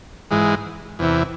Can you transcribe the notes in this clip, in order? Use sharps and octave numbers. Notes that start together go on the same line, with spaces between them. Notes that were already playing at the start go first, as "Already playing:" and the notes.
G#2 E3 G#3
E2 C3 E3